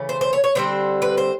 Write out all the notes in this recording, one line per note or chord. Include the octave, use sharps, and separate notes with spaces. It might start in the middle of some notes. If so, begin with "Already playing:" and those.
Already playing: C#3 E3 A3 C#4
C5
C5
C#5
C#5
D3 G3 C4 C5
B4
C5